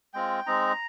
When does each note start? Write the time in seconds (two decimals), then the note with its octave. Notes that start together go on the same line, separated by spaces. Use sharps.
0.14 G#3 C4 F4 G5
0.46 G#3 C4 D#4 A#5